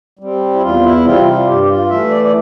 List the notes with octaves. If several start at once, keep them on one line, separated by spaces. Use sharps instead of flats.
G3 C4
E4
E2 F4
E4
C3 G3 C4 F4
F4
G2 G4
G4
F4
E3 A3 E5
D5
D5